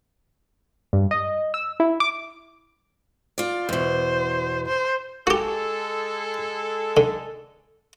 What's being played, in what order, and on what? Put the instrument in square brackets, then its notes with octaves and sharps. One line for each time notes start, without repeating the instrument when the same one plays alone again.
[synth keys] G2
D#5
E6
E4
D6
[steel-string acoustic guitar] F4 D5
[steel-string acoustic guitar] E2 B2 [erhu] C5
[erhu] C5
[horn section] G#3 A4 [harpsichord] F#4 G4
[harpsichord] D3